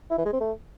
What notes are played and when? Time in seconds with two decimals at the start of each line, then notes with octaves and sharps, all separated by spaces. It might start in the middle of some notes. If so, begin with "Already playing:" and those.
0.11 E4
0.18 E3
0.25 G#3
0.33 C4
0.40 A3